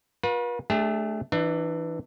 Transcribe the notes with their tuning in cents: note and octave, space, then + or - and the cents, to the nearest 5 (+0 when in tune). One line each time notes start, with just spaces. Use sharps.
F4 +40 B4 -40
A3 -20 D4 -5 G4 +45
E3 +0 D4 +35